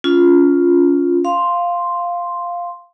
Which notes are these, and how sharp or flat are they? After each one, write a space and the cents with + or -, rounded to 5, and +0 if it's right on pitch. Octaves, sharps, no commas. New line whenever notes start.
C#4 +25 F4 +0
F5 +0 C6 +0